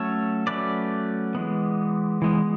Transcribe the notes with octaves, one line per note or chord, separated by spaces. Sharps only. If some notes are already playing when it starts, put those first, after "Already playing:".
Already playing: F#3 A3 C#4 A4 C#5
F#3 A3 C#4 B4 D5
E3 G#3 B3
E3 G#3 B3